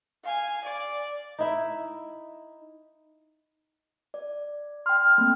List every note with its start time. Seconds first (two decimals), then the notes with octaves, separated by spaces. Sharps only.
0.23 F5 G#5
0.64 D5
1.39 D#4 E4 E5
4.14 D5
4.86 G5 C6 F6
5.18 A3 A#3 C4